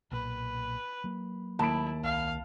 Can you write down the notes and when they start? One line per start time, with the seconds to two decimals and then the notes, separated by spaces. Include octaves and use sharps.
0.11 B1 A#2 B4
1.04 F#3 A#3
1.59 D#2 E4 A5 B5 D7
2.03 C2 F5